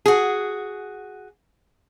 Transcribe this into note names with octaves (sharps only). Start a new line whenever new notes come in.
F#4 G#4